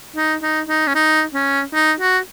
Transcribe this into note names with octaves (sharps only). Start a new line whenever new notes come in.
D#4
D#4
D#4
C#4
D#4
C#4
D#4
F#4